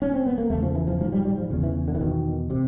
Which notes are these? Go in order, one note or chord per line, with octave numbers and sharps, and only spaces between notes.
C#4
C4
B3
A#3
E2 C#3 A3
F3
E3
F3
G#2 F3
G3
G3
F3
E2 C#3
E3
D3
E3
E2 B2 D#3
C3